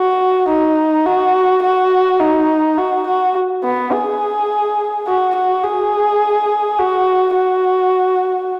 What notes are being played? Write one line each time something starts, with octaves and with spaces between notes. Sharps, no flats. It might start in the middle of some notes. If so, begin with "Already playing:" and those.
Already playing: F#4
D#4
F#4
F#4
D#4
F#4
F#4
B3
G#4
F#4
F#4
G#4
F#4
F#4